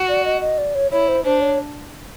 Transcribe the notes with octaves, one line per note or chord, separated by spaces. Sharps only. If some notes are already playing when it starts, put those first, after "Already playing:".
Already playing: F#4
D5
D#5
D#5
D5
C#5
E4 C#5
C5
D4 C5
C#5